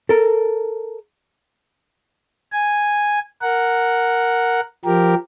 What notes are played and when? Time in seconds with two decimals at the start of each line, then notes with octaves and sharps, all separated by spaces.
0.09 A4 A#4
2.52 G#5
3.42 A#4 F#5
4.85 F3 G4 A#4